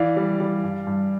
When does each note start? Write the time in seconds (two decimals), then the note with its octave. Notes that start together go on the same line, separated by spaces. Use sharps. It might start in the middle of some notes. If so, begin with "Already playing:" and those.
Already playing: E3 D5 F5
0.17 G3
0.40 G3
0.64 G2
0.87 G2